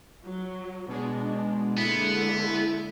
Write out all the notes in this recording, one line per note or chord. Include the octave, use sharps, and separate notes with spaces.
F#3
B2 G#3 D4
D3 G#3 A#3 B3 E4